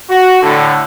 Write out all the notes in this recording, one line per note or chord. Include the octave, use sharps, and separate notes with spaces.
F#4
A2 D3